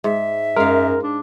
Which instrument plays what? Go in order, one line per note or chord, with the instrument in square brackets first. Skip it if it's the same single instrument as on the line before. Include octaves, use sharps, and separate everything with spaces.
[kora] G#2 [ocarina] E5
[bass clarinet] F#2 [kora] G#3 F5 [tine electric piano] A#4
[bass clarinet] D4